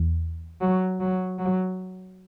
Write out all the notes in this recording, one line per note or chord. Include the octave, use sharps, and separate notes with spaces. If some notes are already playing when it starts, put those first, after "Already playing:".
Already playing: E2
F#3
F#3
F#3